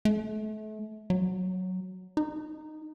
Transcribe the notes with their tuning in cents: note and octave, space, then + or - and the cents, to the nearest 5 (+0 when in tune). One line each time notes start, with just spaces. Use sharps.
A3 -35
F#3 +0
D#4 -10